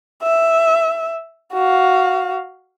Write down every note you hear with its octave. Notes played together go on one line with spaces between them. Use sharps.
E5
F#4 F5